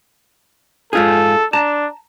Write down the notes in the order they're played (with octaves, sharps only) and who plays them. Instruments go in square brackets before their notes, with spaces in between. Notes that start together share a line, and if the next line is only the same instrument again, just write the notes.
[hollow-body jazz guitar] G#2 F4 G#4 [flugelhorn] A4
[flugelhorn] D4 [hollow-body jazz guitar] A5 A#5